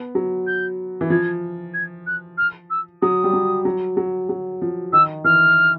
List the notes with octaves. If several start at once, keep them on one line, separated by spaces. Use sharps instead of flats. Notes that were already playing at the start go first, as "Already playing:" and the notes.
Already playing: B3
F#3
G6
E3
F3 G#6
G#6
F#6
F6
E6
F#3 D#6
G3
F#3
F#3
F#3
F#3
F3
D#3 E6
E3 F6